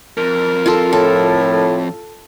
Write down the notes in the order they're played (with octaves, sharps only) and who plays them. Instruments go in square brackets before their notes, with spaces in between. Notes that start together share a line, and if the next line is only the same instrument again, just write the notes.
[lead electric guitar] F2 [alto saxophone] A#4
[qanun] F4 A4
[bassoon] A2 [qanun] A4